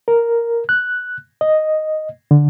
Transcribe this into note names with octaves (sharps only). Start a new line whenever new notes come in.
A#4
F#6
D#5
D3